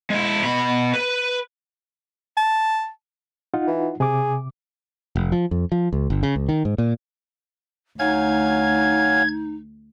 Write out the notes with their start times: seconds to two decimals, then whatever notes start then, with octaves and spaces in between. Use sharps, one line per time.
0.10 G#3 E4
0.44 B2 B5
0.94 B4
2.37 A5
3.54 D#4 F4 F#5
3.67 E3
4.00 C3 G#4 D6
5.16 F1
5.32 F3
5.51 F2
5.72 F3
5.93 C#2
6.10 G1
6.23 C#3
6.36 C#2
6.49 D#3
6.65 G#2
6.78 A#2
7.99 D2 F#3 D#4 F5 G#5 G#6